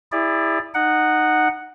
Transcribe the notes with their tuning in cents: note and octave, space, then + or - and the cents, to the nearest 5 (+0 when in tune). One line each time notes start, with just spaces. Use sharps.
E4 +0 G#4 -40 D5 +0
D#4 -15 F#5 +0